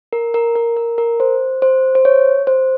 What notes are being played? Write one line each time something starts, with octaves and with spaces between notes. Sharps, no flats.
A#4
A#4
A#4
A#4
A#4
C5
C5
C5
C#5
C5